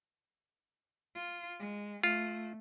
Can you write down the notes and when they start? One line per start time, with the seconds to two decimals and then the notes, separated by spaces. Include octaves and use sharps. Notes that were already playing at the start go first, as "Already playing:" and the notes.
1.15 F4
1.59 G#3
2.04 A3 F4